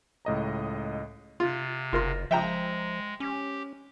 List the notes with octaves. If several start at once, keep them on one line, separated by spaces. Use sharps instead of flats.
C#2 A2 D#5 A#5
C3 F4
F#1 F4 A#4 C6
F3 G#3 E5 G5 A#5
C#4 G4